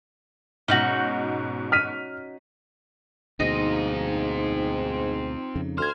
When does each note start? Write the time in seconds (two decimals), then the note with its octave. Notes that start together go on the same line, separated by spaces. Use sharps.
0.68 G#2 B2 C#4 D#4 F#4
1.72 F6 B6 D#7
3.40 D2 G#2 B2 C4 D#4 F4
5.56 F2 C#3
5.78 D2 C5 F6 G#6